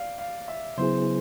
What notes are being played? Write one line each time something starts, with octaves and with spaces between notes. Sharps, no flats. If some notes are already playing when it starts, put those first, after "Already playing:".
Already playing: D5 F5
F5
E5
C#3 F#3 B3 E4 G#4 C5